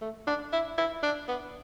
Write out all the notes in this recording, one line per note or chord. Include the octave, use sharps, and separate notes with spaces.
A3
D4
E4
E4
D4
B3